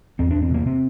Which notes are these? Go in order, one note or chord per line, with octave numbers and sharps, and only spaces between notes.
E2 C4
D4
E2
C4
C3 A#3
C3 C4